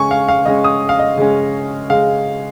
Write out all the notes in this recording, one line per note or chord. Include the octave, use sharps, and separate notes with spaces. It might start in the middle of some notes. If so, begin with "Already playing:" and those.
Already playing: C#3 G#3 C#4 G#5 C#6
F5
F5
C#3 G#3 C#4 D#5
D#6
F5
D#5
C#3 G#3 C#4
C#3 G#3 F5